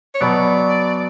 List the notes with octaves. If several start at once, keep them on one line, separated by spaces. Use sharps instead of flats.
C#5
B2 F#3 B3 D5